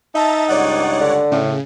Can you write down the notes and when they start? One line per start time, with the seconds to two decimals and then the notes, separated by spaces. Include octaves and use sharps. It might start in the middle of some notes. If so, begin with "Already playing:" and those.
0.15 D#4 E5 A5 A#5 A6
0.48 C#2 G2 C#5 D5 F#5
1.01 D3
1.32 A2 C#3